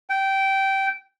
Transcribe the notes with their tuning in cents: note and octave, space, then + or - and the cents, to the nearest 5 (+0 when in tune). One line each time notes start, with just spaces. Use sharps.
G5 -15